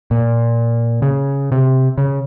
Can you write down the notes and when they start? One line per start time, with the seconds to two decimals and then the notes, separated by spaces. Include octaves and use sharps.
0.11 A#2
1.02 C#3
1.52 C3
1.98 C#3